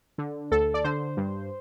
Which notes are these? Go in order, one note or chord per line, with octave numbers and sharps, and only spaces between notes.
D3
D2 A4
D5
D3 C5
G2